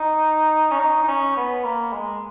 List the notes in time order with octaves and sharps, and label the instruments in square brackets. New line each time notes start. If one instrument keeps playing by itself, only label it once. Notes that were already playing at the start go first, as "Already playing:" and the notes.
Already playing: [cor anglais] D#4
C#4
D#4
D#4
C#4
B3
A#3
G#3